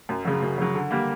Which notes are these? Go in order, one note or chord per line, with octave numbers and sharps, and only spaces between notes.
F#2
C#3 F#3
F#2
C#3 F#3
D3
G3 A#3